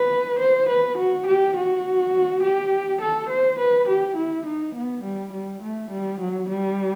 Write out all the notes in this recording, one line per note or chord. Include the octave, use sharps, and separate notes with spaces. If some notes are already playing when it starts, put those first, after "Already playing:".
Already playing: B4
C5
B4
F#4
G4
F#4
G4
A4
C5
B4
G4
E4
D#4
B3
G3
G3
A3
G3
F#3
G3